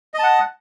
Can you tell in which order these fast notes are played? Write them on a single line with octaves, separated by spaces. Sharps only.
D#5 A5 F#5